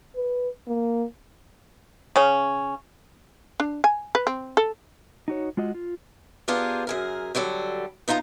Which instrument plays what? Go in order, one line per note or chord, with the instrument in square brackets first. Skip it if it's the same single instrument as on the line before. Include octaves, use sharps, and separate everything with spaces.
[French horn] B4
A#3
[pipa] C#3 C#4
[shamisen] D4
G#5
B4
C4
A4
[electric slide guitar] D#4 F#4 C#5
G#3 F4 F#4 D#5
F4
[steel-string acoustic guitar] B3 D4 F4 G4 G#4 A#4
F#2 G#4 A#4
D3 F#3 G3 A4
B3 D#4 F4 G#5 A#5